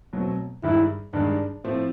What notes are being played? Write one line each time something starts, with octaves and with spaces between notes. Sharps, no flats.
B2 F#3 A3 C4
G2 D#3 G#3 E4
G2 D#3 G#3 D4
A2 F3 A3 C4